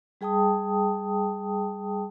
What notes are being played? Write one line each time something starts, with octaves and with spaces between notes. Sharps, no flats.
G3 G#4 G5 A5 D#6